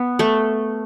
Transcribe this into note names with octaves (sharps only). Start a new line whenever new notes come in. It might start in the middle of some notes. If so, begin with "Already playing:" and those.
Already playing: B3
A3